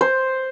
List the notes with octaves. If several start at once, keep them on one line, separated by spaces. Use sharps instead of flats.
C5